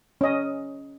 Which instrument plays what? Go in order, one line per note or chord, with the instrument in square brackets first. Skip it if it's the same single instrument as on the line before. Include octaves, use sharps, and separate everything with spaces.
[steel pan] C#4 D#5